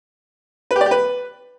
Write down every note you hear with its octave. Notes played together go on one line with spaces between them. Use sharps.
B4
G4
D5
G4
B4